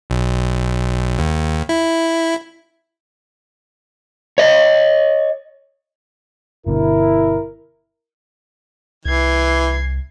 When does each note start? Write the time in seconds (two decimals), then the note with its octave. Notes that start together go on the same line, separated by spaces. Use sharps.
0.10 B1
1.19 D#2
1.69 E4
4.38 C#5 D#5
6.66 G1 B2 D3 E4 A#4
9.06 C2 E3 G#6 C7